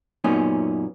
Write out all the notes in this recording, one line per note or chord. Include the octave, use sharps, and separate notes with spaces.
F#2 A#2 B3 C#4 D#4